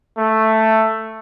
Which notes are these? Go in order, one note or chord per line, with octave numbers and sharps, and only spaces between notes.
A3